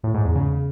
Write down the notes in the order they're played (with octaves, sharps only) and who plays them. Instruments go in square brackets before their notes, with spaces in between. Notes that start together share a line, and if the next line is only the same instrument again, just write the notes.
[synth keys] A2
G#2
E2
C#3